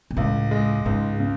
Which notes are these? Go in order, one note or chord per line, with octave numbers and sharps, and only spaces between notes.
B2
C#2 A2
G#3
C#2 G#2
C#3